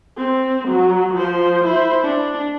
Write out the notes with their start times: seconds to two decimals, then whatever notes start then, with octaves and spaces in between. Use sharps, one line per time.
0.17 C4
0.68 F#3
1.13 F3 C5
1.64 E4 C5
2.03 D4